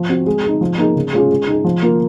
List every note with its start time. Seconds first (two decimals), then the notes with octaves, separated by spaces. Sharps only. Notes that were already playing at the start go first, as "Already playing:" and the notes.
Already playing: F3
0.09 C4 F#4
0.26 G#3
0.44 D#4 G#4
0.61 F3
0.78 A#3 D#4 G#4
0.95 C#3
1.13 G#3 C#4 F4 G#4
1.31 G#3
1.47 D#4 G#4
1.64 F3
1.82 A#3 F4